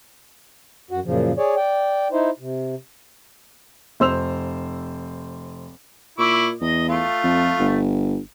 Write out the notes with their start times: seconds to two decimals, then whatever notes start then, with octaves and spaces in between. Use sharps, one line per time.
0.91 F#2 F#4
1.05 F#2 A#2 C#3 F3
1.38 G#4 C#5 D5
1.57 D5 G5
2.12 D#4 E4 C5
2.39 C3
4.00 F1 C5 E6 F7
6.18 A#2 E4 C#6 D6
6.61 E2 D#5
6.88 A3 F4
7.24 F2
7.59 G1